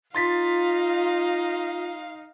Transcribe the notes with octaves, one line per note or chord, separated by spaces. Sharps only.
D#4 F4 F5 C6 A6 B6